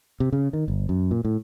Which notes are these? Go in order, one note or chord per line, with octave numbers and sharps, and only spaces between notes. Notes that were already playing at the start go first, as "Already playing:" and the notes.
C3
C#3
D#3
G1
F#2
A#2
A2